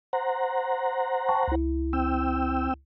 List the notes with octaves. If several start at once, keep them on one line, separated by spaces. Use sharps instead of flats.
C5 F#5 A#5
G5 A5 C#6
C#2 E4
C4 G5 E6